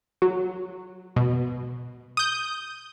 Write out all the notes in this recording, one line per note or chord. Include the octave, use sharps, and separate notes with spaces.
F#3
B2
D#6 G6